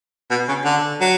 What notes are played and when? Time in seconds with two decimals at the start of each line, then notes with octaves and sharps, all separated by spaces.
0.30 B2
0.48 C#3
0.65 D3
1.01 F#3